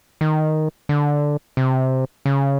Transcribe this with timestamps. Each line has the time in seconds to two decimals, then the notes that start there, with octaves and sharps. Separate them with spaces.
0.21 D#3
0.89 D3
1.57 C3
2.26 C#3